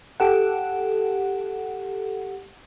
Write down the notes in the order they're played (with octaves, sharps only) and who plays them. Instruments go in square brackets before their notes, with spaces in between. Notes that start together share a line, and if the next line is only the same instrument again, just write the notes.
[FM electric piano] G4 A4 F#5